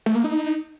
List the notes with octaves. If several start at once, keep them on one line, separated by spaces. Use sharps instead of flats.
A3
A#3
D#4